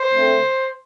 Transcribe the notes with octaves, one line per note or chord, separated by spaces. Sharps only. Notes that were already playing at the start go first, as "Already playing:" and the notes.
Already playing: C5
D3 A3 C4